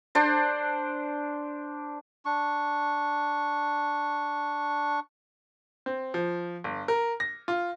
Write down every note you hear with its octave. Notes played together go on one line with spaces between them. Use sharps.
D4 C5
D4 C#6
C4
F3
G1
A#4
A#6
F4